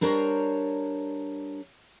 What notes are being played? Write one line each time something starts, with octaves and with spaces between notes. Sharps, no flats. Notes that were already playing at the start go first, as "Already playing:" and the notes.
G3 D4 A#4 C5 C#5 A#5